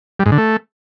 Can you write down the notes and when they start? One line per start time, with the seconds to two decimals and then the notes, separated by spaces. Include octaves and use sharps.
0.20 G3
0.26 G#2
0.32 D3
0.38 A3